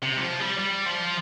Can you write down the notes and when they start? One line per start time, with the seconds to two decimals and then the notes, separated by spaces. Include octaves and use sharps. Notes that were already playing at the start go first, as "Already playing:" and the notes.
0.02 C3
0.17 G3
0.21 F3
0.39 G3
0.58 G3
0.86 F3